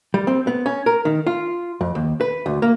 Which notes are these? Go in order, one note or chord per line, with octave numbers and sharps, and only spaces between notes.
G3
C4
B3
C#4
A#4
D#3
F4
F2
D#2
B4
D2
A#3